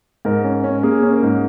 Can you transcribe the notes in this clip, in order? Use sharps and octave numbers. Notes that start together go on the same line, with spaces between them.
G#2 A#4
C#4
C#4
A#3 G#4
C#4
A#4
G#2